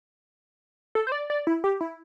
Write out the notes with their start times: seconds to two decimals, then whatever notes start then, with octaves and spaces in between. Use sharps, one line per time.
0.95 A4
1.07 C5
1.12 D5
1.30 D5
1.47 E4
1.64 G4
1.81 E4